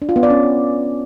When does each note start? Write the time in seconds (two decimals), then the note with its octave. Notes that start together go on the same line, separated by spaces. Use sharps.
0.02 D4
0.09 F4
0.16 B3
0.23 D5
0.30 C#4